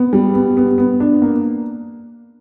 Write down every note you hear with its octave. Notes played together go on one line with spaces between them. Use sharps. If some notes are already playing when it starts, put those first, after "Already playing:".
Already playing: B3
G3
B3
B3
B3
D4
A#3